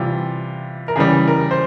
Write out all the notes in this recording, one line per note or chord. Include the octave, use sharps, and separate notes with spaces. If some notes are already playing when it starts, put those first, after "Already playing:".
Already playing: C3 E3 G3 F4
A#4
C#3 E3 G3 G#4
A#4
C5